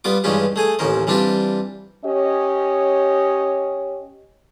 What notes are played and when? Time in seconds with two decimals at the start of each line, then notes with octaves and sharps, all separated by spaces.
0.04 G3 B3 F4 D6
0.24 G2 E3 G#3 C#4 F4 G4
0.56 A3 G#4 G#5
0.79 A1 D#2 C#4 A#4 C5
1.07 E3 G3 C4 D4 F4 G4
2.05 C#4 G4 C#5 D#5